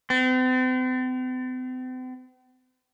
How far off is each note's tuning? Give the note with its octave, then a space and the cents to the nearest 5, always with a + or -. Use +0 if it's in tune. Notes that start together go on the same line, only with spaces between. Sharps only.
C4 -45